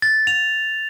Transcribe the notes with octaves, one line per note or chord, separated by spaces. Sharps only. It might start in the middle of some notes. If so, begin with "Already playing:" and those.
A6
F7